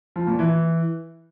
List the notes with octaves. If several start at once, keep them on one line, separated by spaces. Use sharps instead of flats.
F3
A#2
E3